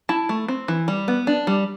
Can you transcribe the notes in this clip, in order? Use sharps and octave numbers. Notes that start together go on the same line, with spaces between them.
E4 A5
A3
C4
E3
G3
B3
D4
G3